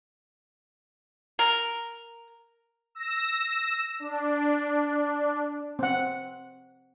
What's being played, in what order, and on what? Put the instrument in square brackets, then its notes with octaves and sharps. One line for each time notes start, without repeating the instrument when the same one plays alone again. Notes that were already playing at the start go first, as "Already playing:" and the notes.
[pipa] A#4
[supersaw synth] E6 A#6
D4
[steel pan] C4 F#5